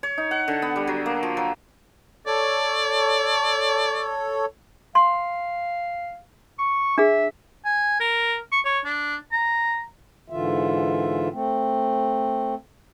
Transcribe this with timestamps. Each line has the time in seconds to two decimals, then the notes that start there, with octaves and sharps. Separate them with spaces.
0.03 C#5
0.18 D#4
0.31 F#5
0.48 D3
0.62 B3
0.76 G3
0.87 F#3
1.06 A#3
1.23 F3
1.37 F#3
2.27 A4 C#5 D5
4.95 F5 C6
6.59 C#6
6.98 D4 G#4 E5
7.65 G#5
8.00 A#4
8.52 C#6
8.65 C#5
8.85 D4
9.32 A#5
10.30 G#2 D3 E3 F4 E5
11.32 A3 C4